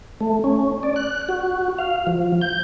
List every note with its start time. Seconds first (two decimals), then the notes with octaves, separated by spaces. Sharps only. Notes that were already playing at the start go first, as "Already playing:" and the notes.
0.21 A3
0.44 C#4
0.83 D5
0.96 F#6
1.29 F#4
1.79 F5
2.07 F3
2.41 G6